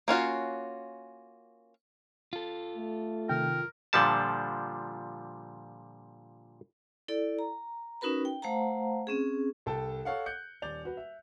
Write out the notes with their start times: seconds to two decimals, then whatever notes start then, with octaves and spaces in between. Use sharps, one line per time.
0.08 A#3 C#4 F4 F#4
2.33 F4 A4
2.77 A3
3.29 C3 D#3 A#4 G5
3.93 A#2 D3 F3 G3 A5
7.08 E4 A4 D5
7.39 A#5
8.01 C#4 D#4 F#4 A#4 B4 B5
8.25 G5
8.42 A3 C5 F5 F#5 A5 A#5
9.07 C4 C#4 G#4
9.66 C2 A4 G5 A5
10.05 A4 C#5 F5 F#5
10.26 F#6 G6 C#7
10.62 D#1 D5 G6 F7
10.85 F#4 B4
10.97 E5